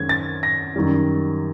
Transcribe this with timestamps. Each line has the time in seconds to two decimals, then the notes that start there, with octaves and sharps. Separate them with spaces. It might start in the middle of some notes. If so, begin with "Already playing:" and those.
Already playing: F#2 D#3 G#3 C#4 G#6
0.09 A6
0.43 A#6
0.76 F#2 D#3 G3